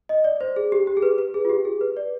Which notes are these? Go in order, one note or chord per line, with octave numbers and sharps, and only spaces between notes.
D#5
D5
C5
G#4
G4
G4
G#4
B4
B4
G#4
F4
G4
G#4
B4
D5